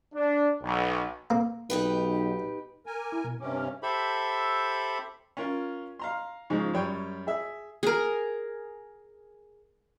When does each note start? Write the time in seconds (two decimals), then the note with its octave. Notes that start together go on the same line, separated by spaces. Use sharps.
0.14 D4
0.62 B1
1.30 A#3
1.70 B1 D#4 G4 B4
2.86 A#4 G#5
2.98 D6
3.12 E4
3.24 B2
3.40 G2 C3 C#4 D6
3.57 F6
3.83 G4 A4 C5 E5 B5
5.37 C#4 F4 A#4
5.99 F5 A#5 C6
6.50 G#2 C#3 F3 G#3
6.74 F#2 G3 C#5 G5
7.27 G#4 E5
7.83 G#4 A#4